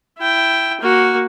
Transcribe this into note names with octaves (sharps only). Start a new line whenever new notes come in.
E4 G5
A#3 F#4